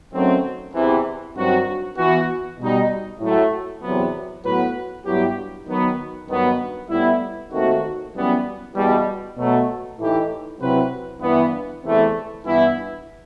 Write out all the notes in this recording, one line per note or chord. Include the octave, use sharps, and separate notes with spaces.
F#2 D#3 F#3 A3 C4
E2 C3 E3
G2 D#3 F#3 C4 F#4
E3 B3 F#4
B2 G3 D#4
A2 F#3 A3
E2 C3 F#3 B3
A2 F#3 B3 F#4 B4
G2 F#3 B3 E4 G4
D#3 F#3 B3
G2 D#3 F#3 B3
A2 G3 B3 E4
D#2 D#3 A3 C4 F#4
F#2 E3 G3 B3
E2 B2 G3
B2 F#3 A3
A2 E3 A3 D#4 G4
C3 F#3 C4 E4 B4
G2 E3 B3
E2 C3 E3 A3
G2 E3 B3 E4